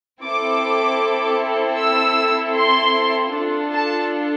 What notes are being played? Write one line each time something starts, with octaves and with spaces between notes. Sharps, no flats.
C4 E4 A4 D6
E6
C6
D4 F4 A4
A5